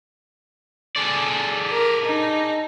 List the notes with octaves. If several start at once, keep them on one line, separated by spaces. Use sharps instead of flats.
G#4 A4 D5
A#4
D#4